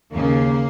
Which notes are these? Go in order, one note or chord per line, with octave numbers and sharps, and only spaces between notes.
D#2 C#3 A#3